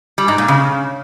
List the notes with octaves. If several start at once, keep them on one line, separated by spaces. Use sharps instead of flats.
G3
G#2
A#2
C#3